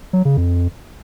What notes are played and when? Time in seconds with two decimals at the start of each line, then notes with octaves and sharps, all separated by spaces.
0.13 F#3
0.25 C#3
0.37 F2